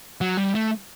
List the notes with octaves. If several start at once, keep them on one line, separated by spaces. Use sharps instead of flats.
F#3
G3
A3